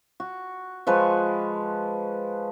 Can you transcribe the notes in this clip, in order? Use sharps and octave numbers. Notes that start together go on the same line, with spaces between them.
F#4
F3 G#3 B4 C#6